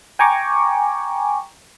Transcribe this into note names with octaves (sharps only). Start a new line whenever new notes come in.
G5 G#5 A#5 C#6 D6